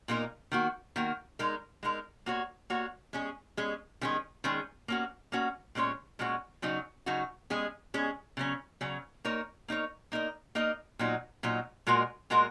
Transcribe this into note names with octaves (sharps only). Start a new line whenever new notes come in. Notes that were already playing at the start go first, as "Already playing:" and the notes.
A#2 A#3 D#4 A#4
D#3 A#3 F#4
D#3 A#3 F#4
G#3 D#4 A#4
G#3 D#4 A#4
A#3 F#4 C#5
A#3 F#4 C#5
G#3 C#4 G#4
G#3 C#4 G#4
D#3 G#3 C#4 G#4
D#3 G#3 C#4 G#4
A#3 C#4 F#4
A#3 C#4 F#4
A#2 G#3 C#4 F#4 C#5
A#2 G#3 C#4 F#4 C#5
C#3 F#3 D#4 F#4
C#3 F#3 D#4 F#4
G#3 C#4 G#4
G#3 C#4 G#4
C#3 F#3 C#4
C#3 F#3 C#4
A#3 D#4 A#4 C#5
A#3 D#4 A#4 C#5
A#3 D#4 A#4 D#5
A#3 D#4 A#4 D#5
A#2 F#3 D#4
A#2 F#3 D#4
A#2 G#3 F#4 A#4 D#5
A#2 G#3 F#4 A#4 D#5